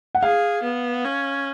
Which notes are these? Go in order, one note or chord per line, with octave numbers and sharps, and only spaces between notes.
F#5
G#4 F5
B3
C#4